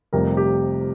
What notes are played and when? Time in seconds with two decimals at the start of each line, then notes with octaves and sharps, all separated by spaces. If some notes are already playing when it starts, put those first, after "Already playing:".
0.13 F1 F2 C3 G3 A#4
0.37 G4